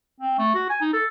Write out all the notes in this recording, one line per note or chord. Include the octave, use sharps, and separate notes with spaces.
C4
A3
F#4
G#5
D#4
A4